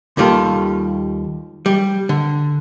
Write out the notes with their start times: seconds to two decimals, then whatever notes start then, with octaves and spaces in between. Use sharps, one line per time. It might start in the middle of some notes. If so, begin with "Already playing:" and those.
0.17 D#2 D#3 G3 F4 A4
1.66 G3
2.09 D3